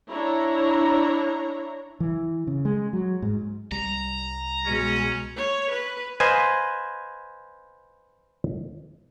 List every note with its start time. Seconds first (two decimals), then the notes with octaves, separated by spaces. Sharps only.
0.10 D4 E4 C#5 A#5
2.00 E3
2.47 C#3
2.65 G#3
2.93 F#3
3.22 G#2
3.72 C2 G3 A#5
4.66 B2 G#3 C#4
5.36 C#5
5.70 B4
6.20 B4 C5 D#5 F5 G#5